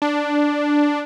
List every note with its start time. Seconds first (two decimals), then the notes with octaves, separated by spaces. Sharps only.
0.02 D4